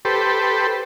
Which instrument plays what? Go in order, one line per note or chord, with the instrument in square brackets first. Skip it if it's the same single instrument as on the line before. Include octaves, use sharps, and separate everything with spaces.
[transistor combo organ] G4 A4 B4 C5